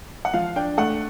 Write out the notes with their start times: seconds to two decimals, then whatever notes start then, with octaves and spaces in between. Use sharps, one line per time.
0.25 F#5
0.34 F3 F5
0.56 D4 G5
0.78 A3 F#5